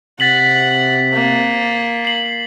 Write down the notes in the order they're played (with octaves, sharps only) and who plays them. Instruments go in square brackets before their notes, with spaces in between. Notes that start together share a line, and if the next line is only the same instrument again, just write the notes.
[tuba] C3 [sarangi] F#5 [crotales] A6 B6 F#7
[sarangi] A#3
[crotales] C7 F#7